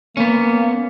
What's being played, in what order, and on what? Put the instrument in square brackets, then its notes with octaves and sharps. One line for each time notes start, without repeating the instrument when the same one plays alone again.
[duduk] A#3 [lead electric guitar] B3 C#4